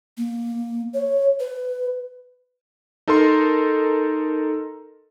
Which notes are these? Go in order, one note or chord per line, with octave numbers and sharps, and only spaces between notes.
A#3
C#5
B4
D#4 A4 A#4 A#5 C6